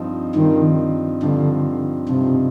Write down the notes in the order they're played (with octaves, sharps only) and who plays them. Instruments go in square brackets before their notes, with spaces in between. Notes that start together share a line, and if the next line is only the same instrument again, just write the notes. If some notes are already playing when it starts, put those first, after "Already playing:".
Already playing: [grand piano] G2 F3 C4 D#4
[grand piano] G2 F3 C4 D#4 [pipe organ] D#3
[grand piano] G2 F3 C4 D#4 [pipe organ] D3
[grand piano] G2 F3 C4 D#4 [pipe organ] C3